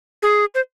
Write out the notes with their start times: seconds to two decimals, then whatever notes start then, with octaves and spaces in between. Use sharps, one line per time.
0.23 G#4
0.55 C5